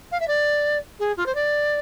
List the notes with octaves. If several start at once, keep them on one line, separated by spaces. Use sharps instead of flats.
F5
E5
D5
G#4
F4
C5
D5